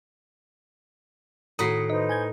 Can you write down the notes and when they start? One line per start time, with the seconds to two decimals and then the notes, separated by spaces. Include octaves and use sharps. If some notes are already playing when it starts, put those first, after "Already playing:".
1.59 A2 D#3 F#4 F#5 A#5 D#6 B6 C7
1.90 D#4 B4 C5 D#5
2.09 G#5 G6 G#6